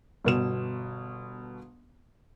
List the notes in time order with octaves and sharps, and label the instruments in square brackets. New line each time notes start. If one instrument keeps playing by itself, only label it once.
[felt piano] G1 B2 E7